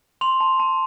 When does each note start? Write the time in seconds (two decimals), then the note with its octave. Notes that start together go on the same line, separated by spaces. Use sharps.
0.21 C6 F7
0.40 A5
0.60 A5